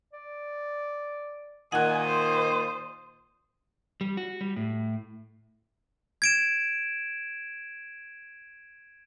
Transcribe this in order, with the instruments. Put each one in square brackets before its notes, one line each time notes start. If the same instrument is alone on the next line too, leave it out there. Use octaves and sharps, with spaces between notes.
[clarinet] D5
[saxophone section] A#2 D#3 [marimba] F#5 F#6 [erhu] G#5 [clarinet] D#6
[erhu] C5
[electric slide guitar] G3
F#4
G3
A2
[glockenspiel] G#6 D7 E7